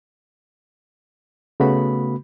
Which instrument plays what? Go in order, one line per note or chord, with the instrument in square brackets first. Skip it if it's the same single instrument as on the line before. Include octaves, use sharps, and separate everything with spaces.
[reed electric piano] C#3 A3 B3 F#4 B5